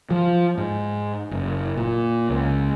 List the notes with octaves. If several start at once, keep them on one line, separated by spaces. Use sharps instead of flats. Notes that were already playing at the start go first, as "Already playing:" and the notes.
F3
G#2
F#1
A#2
C#2